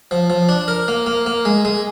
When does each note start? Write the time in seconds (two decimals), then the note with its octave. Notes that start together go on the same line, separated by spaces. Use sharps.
0.11 F3
0.30 F3
0.49 D4
0.68 A#4
0.88 A#3
1.06 A#3
1.26 A#3
1.45 G#3
1.65 G#3